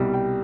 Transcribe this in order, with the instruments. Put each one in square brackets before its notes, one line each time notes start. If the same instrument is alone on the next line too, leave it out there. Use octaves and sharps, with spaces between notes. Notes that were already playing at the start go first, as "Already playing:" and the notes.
Already playing: [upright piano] C2 B2 G3
G5